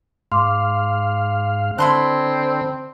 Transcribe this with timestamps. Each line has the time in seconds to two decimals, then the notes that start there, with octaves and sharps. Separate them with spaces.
0.32 G#2 F5 C6 D6
1.78 D3 C4 E4 A5 B5 C6 F#6